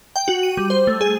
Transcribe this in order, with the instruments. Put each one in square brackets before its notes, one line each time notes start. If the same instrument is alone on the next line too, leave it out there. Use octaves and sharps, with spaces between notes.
[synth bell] G5
F#4
D#7
G3
C5
A3
G#4